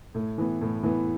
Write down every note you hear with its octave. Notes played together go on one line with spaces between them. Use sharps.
A2
E3 B3
A2
E3 B3